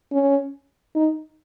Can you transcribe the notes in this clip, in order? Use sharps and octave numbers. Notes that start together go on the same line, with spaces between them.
C#4
D#4